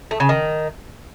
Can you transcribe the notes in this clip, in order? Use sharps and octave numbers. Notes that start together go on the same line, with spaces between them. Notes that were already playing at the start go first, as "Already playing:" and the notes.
A3
C#3
D#3